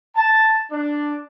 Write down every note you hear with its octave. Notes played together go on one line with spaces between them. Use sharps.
A5
D4